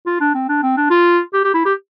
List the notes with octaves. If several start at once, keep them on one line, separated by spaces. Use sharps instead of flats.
F4
D4
C4
D4
C4
D4
F4
G4
G4
E4
G4